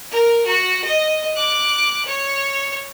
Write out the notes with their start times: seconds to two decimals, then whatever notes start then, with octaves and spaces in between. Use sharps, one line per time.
0.11 A#4
0.46 F#4
0.84 D#5
1.36 D6 F#6
2.05 C#5